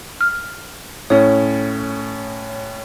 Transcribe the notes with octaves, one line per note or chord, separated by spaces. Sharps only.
F6
A2 C#4 C#5